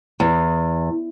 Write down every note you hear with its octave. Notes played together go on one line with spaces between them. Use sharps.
E2